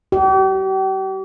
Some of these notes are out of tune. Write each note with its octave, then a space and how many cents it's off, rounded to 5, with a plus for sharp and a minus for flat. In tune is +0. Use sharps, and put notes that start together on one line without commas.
G4 -40